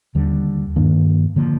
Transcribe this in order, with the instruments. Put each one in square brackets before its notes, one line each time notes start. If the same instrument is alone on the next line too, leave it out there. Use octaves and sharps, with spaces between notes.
[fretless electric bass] D#2 D3 G3
G2 D#3 A#3 D4
D3 F3 A#3